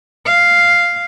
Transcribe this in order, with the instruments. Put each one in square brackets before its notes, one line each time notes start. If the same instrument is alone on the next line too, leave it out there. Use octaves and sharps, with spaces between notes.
[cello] F5